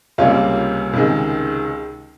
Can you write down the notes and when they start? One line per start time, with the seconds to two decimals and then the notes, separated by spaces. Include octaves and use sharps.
0.18 C#2 C3 G3 A#3 C#4 F4
0.93 C#2 C3 D#3 G#3